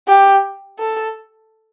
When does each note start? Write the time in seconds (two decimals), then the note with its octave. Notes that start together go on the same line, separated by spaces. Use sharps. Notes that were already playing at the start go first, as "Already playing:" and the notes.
0.08 G4
0.79 A4